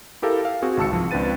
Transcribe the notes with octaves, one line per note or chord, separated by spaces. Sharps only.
E4 G4 A4 A#4 F5
F5
C4 F#4 G#4
G#1 C#2 A5 E6 C#7
C2 F3
C#2 C4 D4 B4 A6 D#7